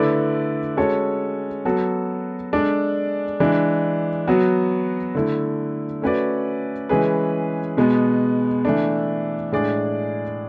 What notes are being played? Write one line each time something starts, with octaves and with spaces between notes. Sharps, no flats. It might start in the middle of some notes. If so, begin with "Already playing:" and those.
Already playing: D3 A3 E4 B4 D5
G#3 C#4 F#4 A4 C#5
F#3 B3 F#4 A4
G#3 D4 A4 D5
E3 G#3 D4
F#3 B3 F#4
D3 A3 E4
A3 C#4 F#4 B4 D5
E3 G#3 C#4 G#4 B4
B2 G#3 B3
E3 A3 D4
A2 G#3 D4 G#4 D5